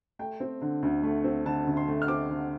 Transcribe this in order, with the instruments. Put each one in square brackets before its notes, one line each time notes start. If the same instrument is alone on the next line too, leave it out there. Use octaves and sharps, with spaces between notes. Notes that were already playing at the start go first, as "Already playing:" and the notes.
[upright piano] A3 G5
C4
D3
D2
A3
C4
D3 A5
D2
C6
A3
F6
C4 D6
D3